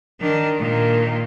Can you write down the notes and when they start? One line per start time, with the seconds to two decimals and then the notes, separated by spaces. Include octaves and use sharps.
0.20 D#3 D4
0.59 A#2 D#3